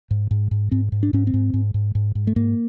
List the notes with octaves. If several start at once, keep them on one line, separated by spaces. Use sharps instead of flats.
G#2
G#2
G#2
G#2 C4
G#2
D4
G#2 C#4
C4
G#2
G#2
G#2
G#2
G#2
A3
G#2 A#3